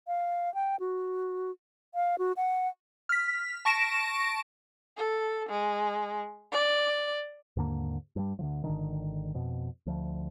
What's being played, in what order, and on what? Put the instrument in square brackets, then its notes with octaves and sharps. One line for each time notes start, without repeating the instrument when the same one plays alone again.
[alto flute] F5
G5
F#4
F5
F#4
F#5
[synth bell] F6 B6
A5 C#6 A#6 D7 E7
[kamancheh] A4
G#3
D5
[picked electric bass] D#2 G#2 D3 A#3
G2 G3
D2 D3 F3
G#1 B2 D3 D#3
F2 B2
D2 F3